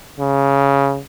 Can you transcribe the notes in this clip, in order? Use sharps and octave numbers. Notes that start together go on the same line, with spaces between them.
C#3